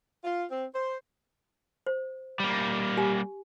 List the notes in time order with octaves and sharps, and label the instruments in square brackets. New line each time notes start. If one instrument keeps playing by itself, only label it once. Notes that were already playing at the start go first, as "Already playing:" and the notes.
[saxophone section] F4
C4
C5
[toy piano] C5
[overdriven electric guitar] G3 A#3
[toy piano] G4 G#5